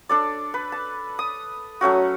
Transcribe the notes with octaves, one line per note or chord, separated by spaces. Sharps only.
D4 A4 D5
B4
A5
D#6
F#3 A3 C#4 F#4